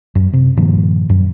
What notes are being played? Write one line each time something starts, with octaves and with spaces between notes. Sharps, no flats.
F#2
C3
G2 A#2 D#3 F3
F#2